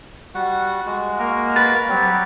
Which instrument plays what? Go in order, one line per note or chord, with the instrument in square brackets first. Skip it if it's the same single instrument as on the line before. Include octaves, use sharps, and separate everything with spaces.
[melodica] G3 F#4 F#5
G#3 F#4
[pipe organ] A#3 A#4
[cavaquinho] B4 [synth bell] A6
[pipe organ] F#3 G3 [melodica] C4 G4